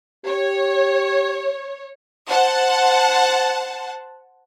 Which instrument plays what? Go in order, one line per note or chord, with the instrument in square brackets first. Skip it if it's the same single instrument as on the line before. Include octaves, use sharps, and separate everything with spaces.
[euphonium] G4 [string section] C#5
[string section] C5 F#5 A5